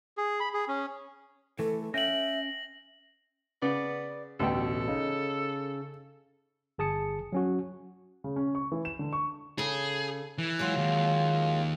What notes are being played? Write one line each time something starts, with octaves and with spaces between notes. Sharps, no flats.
G#4
B5
G#4
C#4
E3 A3 A4
C#4 E5 F5 G5 A#6 F#7
C#3 B3 D5
A1 D2 B2 A4 G5
C#3 D#4
G1 G#4 A5 D#6 C#7
F#3 C#4 F#4
C#3
C#4
C#6
E3
E7
D3
C#6
C#3 G#4 A4
E3
F#3 G#3 F4
D#2